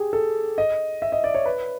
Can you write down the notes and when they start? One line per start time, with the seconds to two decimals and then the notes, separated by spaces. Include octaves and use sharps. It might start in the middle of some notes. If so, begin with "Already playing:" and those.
Already playing: G4 G#4
0.13 A4
0.58 D#5
1.02 E5
1.12 D#5
1.24 D5
1.35 C#5
1.46 B4